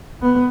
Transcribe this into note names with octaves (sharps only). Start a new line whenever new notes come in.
B3